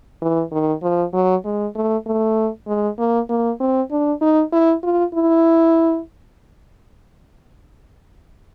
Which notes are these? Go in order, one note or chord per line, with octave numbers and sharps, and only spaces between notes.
E3
D#3
F3
F#3
G#3
A3
A3
G#3
A#3
A#3
C4
D4
D#4
E4
F4
E4